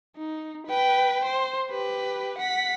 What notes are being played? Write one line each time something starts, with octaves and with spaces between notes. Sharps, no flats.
D#4
B4 G5
C5
G4 B4
F#5 B6